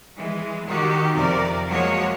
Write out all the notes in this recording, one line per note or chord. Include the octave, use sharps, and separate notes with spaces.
E3 G#3
D#3 F#4 G4
F2 C3 A#4 D5
F3 F#3 G#3 A#3 F#4 C#5